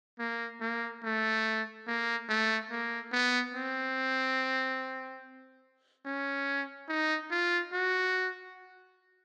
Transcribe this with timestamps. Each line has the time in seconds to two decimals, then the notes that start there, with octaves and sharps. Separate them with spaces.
0.19 A#3
0.61 A#3
1.04 A3
1.87 A#3
2.29 A3
2.71 A#3
3.13 B3
3.54 C4
6.05 C#4
6.89 D#4
7.31 F4
7.73 F#4